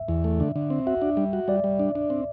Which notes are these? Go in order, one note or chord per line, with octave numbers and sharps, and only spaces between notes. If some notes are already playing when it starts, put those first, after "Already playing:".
Already playing: E5
E2
A3
D3
D3
C4
F#4 E5
D4
G3
F#4
G3 D5
G3
D4
D4
C4